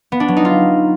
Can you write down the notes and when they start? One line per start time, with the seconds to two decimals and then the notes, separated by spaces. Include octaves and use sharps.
0.12 B3
0.20 D4
0.28 F#3
0.37 D#4
0.45 F4